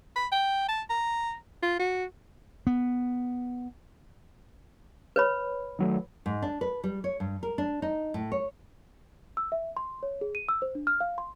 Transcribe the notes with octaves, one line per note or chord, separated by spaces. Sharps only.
B5
G5
A5
A#5
F4
F#4
B3
B4 C#5 B5
D#3 F#3 A3
G#2
D4
B4
G3
C#5
G2
A#4
D4
D#4
A2
C#5
E6
E5
C6
C#5
G#4
D#7
E6
C5
D4
F6
F5
C6